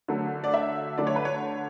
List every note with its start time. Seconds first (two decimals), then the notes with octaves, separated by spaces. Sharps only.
0.08 D3 F#3 A3
0.44 D5
0.54 E5
0.98 D3 F#3 A3 D5
1.07 C#5
1.16 B4
1.25 C#5